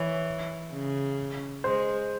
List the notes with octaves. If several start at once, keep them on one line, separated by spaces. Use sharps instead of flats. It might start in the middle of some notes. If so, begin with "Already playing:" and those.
Already playing: E3 C#5
C#3
G#3 C5